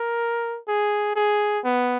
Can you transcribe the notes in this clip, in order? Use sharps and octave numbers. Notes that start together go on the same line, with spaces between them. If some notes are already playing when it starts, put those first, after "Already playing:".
Already playing: A#4
G#4
G#4
B3